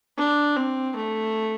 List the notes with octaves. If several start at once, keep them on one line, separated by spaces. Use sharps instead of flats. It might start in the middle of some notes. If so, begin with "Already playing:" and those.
D4
C4
A3